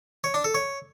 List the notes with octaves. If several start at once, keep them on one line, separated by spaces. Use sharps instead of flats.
C#5
D4
A4
C#5